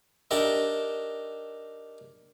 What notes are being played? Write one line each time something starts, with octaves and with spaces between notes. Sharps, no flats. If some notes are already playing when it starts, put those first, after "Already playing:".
D4 D#4 G4 A#4 E5